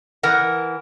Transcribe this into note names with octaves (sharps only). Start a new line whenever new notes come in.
E3 A#4 F#5